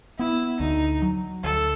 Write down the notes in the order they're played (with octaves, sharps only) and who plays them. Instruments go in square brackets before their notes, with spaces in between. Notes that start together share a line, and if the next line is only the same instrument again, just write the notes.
[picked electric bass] B3 [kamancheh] E4
[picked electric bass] D2 [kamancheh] D#4
[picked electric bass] F#3
[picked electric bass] D2 [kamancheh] A4